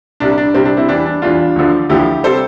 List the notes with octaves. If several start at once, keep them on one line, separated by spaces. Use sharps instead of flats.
C2 C3 G3 D4
D4
C2 C3 G3 C4
D4
C4 E4
E2 E3 G3 D4
D4
E2 E3 G3 D4 F4
D2 D3 F3
D2 D3 F3 E4 G4
C3 G3 A4 C5